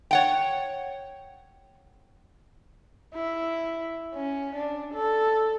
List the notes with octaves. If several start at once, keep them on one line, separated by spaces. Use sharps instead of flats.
C#5 F#5 G5
E4
C#4
D4
A4